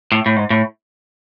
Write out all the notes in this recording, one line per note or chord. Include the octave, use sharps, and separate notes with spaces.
A2
A2
G#2
A2